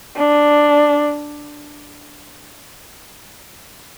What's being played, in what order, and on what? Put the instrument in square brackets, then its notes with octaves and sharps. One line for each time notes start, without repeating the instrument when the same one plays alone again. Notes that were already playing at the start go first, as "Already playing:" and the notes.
[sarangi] D4